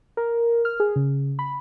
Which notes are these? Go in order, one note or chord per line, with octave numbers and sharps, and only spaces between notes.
A#4
F6
G#4
C#3
B5